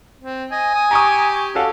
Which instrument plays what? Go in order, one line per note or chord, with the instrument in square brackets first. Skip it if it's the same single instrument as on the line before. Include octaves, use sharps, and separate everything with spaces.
[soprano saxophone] C4
[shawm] D#5 [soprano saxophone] G#5
[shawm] D#6
[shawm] G4 [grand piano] A#5 C#6 D#6
[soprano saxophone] C#4 [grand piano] F#4 A4 F5